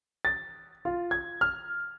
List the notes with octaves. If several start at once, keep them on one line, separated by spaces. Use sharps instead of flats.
A6
F4
G#6
F6